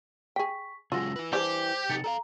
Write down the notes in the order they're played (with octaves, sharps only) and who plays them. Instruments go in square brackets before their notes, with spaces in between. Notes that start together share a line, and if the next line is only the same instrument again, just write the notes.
[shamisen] G#4 G5 [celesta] C#6 B6
[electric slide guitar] C#3 F#3 G#3 [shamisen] F4 F#4 [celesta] E6 A#6
[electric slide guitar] E4 B4
[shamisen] G3 D4 G#4 [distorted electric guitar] G4 [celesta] C5
[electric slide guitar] C3 D#4 [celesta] A6 C#7
[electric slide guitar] A4 D5 F5 [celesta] A#5